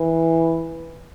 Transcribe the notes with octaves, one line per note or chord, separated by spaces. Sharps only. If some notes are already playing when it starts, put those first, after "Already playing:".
Already playing: E3